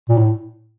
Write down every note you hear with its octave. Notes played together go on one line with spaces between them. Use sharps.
A#2
A2